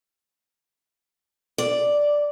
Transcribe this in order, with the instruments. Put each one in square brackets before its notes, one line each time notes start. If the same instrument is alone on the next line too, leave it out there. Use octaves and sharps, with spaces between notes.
[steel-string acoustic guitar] D5